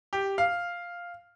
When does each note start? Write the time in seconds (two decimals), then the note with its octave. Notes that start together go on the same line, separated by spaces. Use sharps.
0.13 G4
0.38 F5